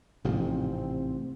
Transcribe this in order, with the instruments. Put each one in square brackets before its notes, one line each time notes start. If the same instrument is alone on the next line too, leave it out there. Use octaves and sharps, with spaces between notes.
[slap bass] A1 G#2 F3 [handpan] C3 [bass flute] C4